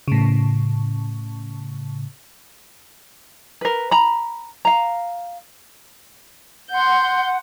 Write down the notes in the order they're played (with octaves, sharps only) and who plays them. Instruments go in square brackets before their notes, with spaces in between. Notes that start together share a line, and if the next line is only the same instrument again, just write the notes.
[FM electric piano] A2 C#3
[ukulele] A#4 B4
A#5 B5
F5 A#5
[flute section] F#5 [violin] C6 G6